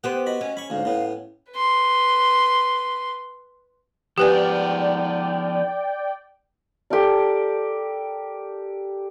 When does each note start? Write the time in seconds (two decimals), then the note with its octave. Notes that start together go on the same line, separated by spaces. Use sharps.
0.04 B3 G4 C5 F#5
0.26 F#4 D#5 B5
0.41 C#4
0.57 B5 C#6
0.70 D2 G#2 F5
0.85 A2 B3
1.53 B4 C6
4.18 F3 B3 G4 B4 D5 G5 G#5
6.90 G4 A4 A#4 D5